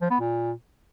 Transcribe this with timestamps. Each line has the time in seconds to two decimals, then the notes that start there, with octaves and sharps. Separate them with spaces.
0.02 F3
0.11 B3
0.20 A#2